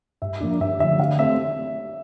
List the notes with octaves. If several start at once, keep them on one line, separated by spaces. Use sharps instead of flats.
G2 E5
F3 A#3 D4
G2 E5
D3 F3 E5
D3 F5
A3 C4 E5